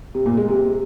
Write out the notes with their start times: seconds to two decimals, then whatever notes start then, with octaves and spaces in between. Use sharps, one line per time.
0.15 C3
0.26 A#2
0.37 G#3
0.48 C3